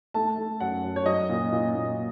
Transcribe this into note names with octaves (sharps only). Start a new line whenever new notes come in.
A3 A5
A3
F#2 F#5
F#2
C#5
F#3 D#5
A#2
A#2
A#2